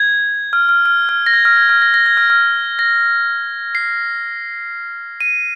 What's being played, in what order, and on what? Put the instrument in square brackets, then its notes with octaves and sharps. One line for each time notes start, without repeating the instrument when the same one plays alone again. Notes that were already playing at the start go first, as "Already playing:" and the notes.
Already playing: [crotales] G#6
F6
F6
F6
F6
A#6
G#6
F6
G#6
F6
A#6
A#6
G#6
F6
F6
A#6
C7
D#7